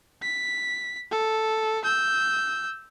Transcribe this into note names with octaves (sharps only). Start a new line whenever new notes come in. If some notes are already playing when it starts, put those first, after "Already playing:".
B6
A4
E6 G6